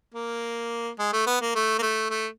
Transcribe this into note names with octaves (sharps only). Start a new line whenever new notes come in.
A#3
G#3
A3
B3
A#3
A3
A#3
A3
A3